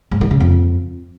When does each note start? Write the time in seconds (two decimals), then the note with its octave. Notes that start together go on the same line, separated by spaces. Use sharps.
0.11 G#2
0.21 D#3
0.31 C#3
0.40 F2